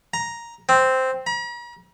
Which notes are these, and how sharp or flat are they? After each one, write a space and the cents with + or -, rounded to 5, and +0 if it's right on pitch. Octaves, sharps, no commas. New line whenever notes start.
A#5 +5
C4 -5
A#5 +45